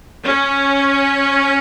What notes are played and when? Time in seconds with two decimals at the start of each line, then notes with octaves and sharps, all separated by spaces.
0.24 C#4